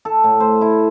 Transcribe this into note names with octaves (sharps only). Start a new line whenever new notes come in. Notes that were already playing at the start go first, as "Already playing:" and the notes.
A4
A2
C5
E4